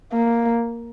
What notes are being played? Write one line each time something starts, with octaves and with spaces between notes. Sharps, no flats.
A#3